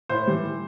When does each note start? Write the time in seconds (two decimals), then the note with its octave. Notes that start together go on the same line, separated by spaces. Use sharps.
0.09 A2 C5
0.27 E3 G3